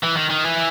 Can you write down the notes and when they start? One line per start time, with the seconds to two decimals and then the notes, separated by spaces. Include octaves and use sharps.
0.04 E3
0.17 D#3
0.30 D#3
0.44 E3